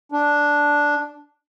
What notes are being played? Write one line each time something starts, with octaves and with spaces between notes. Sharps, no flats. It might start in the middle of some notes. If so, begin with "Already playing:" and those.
D4